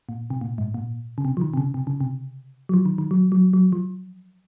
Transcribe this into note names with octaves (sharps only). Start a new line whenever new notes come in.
A#2
C3
A#2
G#2
A#2
C#3
C3
F3
D#3
C3
C#3
C3
C#3
C3
F#3
F3
D#3
D#3
F#3
F#3
F#3
F3